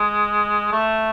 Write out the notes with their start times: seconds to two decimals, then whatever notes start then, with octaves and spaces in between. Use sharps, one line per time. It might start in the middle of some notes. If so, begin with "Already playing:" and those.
Already playing: G#3
0.72 A3